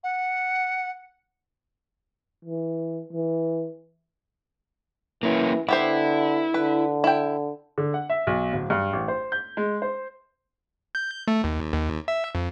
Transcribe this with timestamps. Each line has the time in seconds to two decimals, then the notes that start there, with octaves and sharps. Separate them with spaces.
0.04 F#5
2.45 E3
3.13 E3
5.23 E3 A#3 C#4
5.69 D3 B3 E4 G4 C5
6.54 D3 B4
7.04 E4 G5
7.78 D3
7.94 F#5
8.10 E5
8.27 B1
8.53 D1
8.70 G2
8.93 A1
9.08 C5
9.32 G6
9.57 G#3
9.82 C5
10.95 G6
11.28 A3
11.44 D#2
11.73 D#2
12.08 E5
12.35 F2